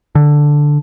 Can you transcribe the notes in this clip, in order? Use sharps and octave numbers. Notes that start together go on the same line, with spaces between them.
D3